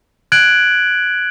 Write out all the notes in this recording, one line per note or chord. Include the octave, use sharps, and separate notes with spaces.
F#6 G#6 D7 F#7